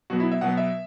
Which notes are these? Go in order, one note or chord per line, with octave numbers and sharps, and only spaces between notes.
B2 F#3 B3 F#4
E4
E5
B2 F#3 B3 F#5
E5